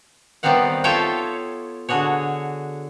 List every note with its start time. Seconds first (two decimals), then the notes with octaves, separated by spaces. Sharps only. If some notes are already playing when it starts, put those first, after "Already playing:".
0.43 D#3 G3 B3 C4 F5 F#5
0.84 F4 A4 C#5 E5 F5 G5
1.89 D3 F#4 G#4 C#5